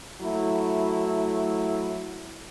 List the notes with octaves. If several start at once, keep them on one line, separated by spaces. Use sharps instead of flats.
F#3 A3 E4